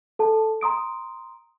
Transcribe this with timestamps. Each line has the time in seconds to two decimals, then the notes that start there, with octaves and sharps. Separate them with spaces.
0.19 A4 A5
0.61 A#5 C6 D#6 D7